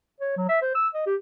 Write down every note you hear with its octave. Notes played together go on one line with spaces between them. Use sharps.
C#5
F#3
E5
C5
E6
D#5
G4